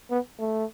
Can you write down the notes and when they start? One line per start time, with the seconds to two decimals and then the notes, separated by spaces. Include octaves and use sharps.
0.10 B3
0.39 A3